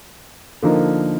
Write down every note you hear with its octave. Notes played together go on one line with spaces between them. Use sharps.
D3 F3 A#3 D#4 A#4